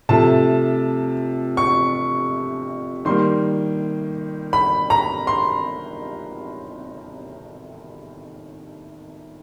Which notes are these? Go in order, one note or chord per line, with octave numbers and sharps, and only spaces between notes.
C3 F3 A3 A5
C#6
D#3 G3 A#3 C6
B5
A#5
C6